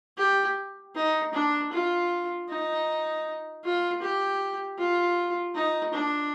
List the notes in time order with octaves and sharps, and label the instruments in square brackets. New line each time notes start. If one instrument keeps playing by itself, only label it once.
[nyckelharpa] G4
D#4
D4
F4
D#4
F4
G4
F4
D#4
D4